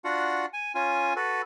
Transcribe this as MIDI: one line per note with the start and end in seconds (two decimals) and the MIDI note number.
0.05 0.46 62
0.05 0.46 65
0.05 0.46 66
0.05 0.46 78
0.53 0.72 80
0.75 1.14 61
0.75 1.14 65
0.75 1.14 80
1.16 1.42 66
1.16 1.42 69
1.16 1.42 71